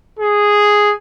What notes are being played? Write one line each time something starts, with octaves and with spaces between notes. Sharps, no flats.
G#4